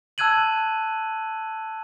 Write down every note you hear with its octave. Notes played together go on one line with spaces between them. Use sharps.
A5 E6 F#6 G#6 D#7 F#7